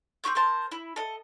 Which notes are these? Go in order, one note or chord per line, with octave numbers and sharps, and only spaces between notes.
C4 G4 C#6 G6
A#4 C5 A5
E4
A4 D#5